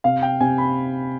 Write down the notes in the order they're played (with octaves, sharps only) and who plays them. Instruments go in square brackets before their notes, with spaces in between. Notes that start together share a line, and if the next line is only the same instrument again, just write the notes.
[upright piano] C3 [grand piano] F5
[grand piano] G5
[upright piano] C3 [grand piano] G#5
[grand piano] B5